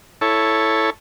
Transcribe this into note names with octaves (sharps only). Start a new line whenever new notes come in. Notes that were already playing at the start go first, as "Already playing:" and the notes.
E4 A4 C#5